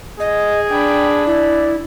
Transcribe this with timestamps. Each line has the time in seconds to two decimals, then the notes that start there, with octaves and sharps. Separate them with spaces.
0.20 G#4 D#5
0.70 D4 G5 B5
1.26 E4 D5